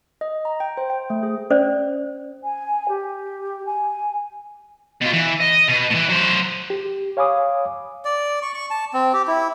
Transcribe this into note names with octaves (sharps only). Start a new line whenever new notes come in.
D#5
A#5
G5
C5
G5
A3
G#4
C#4 C5 D5
G#5
G4
G#5
B2 F4
E3
D#5
B2
A2 E3
F#3 C5
G4
C#5 F5 G#5 B5 D6 D#6
D5
C#6
C#6
A5
C4
G4
E4